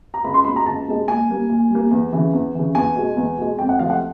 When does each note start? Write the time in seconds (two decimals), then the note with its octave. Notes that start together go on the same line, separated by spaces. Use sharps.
0.14 A#5
0.24 C#2 B5
0.34 C6
0.45 B2 G#3 B5
0.56 A#5
0.66 C#2 A5
0.87 B2 G#3
1.08 A#2 G#5
1.29 G3 A#3
1.50 A#2
1.70 G3 A#3
1.91 E2
2.12 C#3 E3
2.33 E2
2.55 C#3 E3
2.75 E2 G#5
2.96 B2 G#3
3.17 E2
3.38 B2 G#3
3.59 F2 G5
3.69 F#5
3.79 C3 F3 A3 F5
3.90 F#5